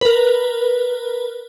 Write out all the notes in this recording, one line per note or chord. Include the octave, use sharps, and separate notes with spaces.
A#4 B4